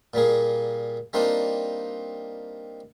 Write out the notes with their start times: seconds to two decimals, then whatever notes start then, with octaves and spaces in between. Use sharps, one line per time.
0.14 A#2 G3 A#3 G#4
1.13 G3 A#3 C4 D4 D#4 F4